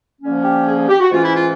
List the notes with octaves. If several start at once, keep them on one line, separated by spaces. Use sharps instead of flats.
D3 F3 A#3 C#4
G4
G#4
G#4
G4
F#4
G#2 E3 A3 C#4 F4
E4
F4